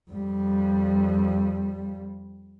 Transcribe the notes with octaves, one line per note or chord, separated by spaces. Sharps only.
F2 G3